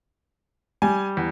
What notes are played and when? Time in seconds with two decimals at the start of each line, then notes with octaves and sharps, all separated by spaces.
0.82 G3 G#5
1.17 E2